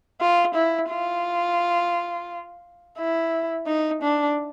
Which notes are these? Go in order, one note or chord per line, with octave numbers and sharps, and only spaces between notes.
F4
E4
F4
E4
D#4
D4